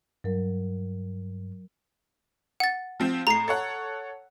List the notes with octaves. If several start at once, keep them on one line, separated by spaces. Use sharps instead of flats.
G2 F#3 A#4
F#5 A6
F3 C4
A2 A#5 C7
A4 C#5 F#5